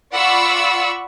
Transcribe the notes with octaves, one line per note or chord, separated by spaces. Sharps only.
F4 D5 F#5 B5 C#6 E6